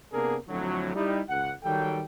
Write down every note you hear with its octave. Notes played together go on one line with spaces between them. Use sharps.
C3 A#3 B3 D4 G#4 A#4
F2 A2 D3 F#3
G3 D#4 E4
C#2 F#5
D#3 F#3 G3 A4 G5